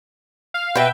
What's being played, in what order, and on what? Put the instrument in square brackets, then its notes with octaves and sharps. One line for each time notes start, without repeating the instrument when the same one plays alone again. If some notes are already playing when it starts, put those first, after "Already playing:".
[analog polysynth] F5
[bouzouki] B2 B4 [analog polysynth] E5 G5